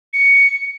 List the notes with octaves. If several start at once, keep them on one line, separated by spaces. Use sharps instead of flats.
C#7